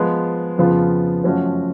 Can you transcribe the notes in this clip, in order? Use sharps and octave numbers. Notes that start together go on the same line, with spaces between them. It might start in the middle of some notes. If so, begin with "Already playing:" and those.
Already playing: F3 G#3 B3
F2 C#3 F3 B3 F4
F#2 F3 A3 C#4 F#4